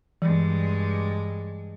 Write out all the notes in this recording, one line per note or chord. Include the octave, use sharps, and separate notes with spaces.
G2 E3 G#3